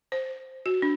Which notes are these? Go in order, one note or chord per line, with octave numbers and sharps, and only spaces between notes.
C5
F#4
D4